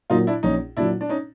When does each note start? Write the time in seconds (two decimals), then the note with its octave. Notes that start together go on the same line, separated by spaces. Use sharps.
0.10 A#2 F#3 D#4 F4
0.27 D4 E4
0.43 A#1 C#4 D#4
0.77 A#2 F#3 D4 E4
1.01 D4
1.09 C#4 D#4